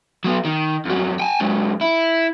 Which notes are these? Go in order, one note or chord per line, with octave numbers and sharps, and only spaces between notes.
F#3 B3
D#3
F2 F#3
G5 G#5
G#2 F#3
E4